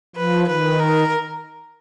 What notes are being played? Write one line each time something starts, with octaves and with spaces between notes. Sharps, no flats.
F3 B4
D#3 B4
A#4